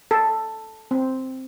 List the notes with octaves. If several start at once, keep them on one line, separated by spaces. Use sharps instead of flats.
A4
C4